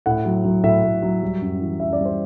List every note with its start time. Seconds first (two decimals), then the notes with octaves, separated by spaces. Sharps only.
0.06 A2 F#5
0.25 F#3
0.44 F#3
0.63 A2 E5
0.83 A2
1.02 F#3
1.22 G3
1.41 F#2
1.61 E3
1.80 F#2 E5
1.93 D5
2.00 G3 C5